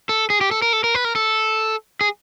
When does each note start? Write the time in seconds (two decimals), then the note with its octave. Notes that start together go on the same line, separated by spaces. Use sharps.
0.09 A4
0.30 G#4
0.41 G4
0.51 A4
0.62 A#4
0.73 A4
0.84 A#4
0.95 B4
1.05 A#4
1.15 A4
2.01 G#4